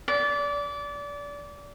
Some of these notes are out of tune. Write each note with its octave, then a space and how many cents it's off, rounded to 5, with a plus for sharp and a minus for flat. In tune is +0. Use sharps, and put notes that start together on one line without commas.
D5 -25